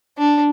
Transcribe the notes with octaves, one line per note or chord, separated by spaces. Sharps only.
D4